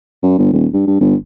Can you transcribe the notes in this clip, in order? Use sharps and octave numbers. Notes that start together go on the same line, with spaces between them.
F#2
G1
D#1
G2
G2
G1